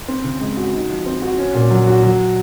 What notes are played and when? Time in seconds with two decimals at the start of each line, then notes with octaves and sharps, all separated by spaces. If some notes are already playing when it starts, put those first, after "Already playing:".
0.08 C4
0.24 C#3
0.41 G#3
0.57 F#4
0.73 D#4
0.89 F3
1.06 C4
1.22 F#4
1.38 C#4
1.55 A#2
1.71 F#3
1.87 F#4
2.03 F#3